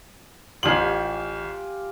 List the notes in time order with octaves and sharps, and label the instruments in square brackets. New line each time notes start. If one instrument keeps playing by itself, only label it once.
[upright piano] A1 F#7 [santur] F4 G4 G#5